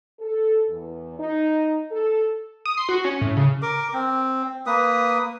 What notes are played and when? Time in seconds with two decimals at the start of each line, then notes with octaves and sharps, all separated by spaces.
0.20 A4
0.69 E2
1.19 D#4
1.91 A4
2.65 D#6
2.77 C6
2.89 F#4
3.05 C#4
3.21 A2
3.37 C#3
3.62 A#4 D6
3.94 C4
4.66 A#3 B4 D#6